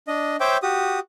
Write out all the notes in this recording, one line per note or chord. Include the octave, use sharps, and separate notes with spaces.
D4 D#5
C5 C#5 E5 G5 D6
F#4 G4 D#6